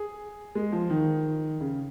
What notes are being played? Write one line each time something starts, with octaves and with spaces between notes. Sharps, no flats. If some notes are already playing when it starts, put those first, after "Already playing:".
Already playing: G#4
G#3
F3
D#3
C#3